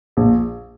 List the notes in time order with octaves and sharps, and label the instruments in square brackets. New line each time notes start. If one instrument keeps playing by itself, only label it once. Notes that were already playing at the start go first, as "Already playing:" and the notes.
[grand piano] A#1